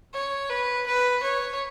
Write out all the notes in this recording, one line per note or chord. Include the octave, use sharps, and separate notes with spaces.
C#5
B4
B4
C#5